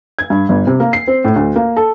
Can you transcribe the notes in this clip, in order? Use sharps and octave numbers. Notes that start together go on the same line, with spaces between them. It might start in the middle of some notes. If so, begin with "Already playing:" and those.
G#6
G2
G1
C3
A#3
C7
C4
A2
D2
A#3
A4